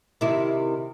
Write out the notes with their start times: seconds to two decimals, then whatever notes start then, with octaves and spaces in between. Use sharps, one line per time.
0.21 C3 D#3 E4